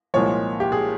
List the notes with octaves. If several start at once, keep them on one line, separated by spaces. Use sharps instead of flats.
C2 A#2 F3 G#3 C#5
G4
G#4